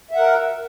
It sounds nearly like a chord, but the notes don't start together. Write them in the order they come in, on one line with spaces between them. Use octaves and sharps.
E5 F#5 A#4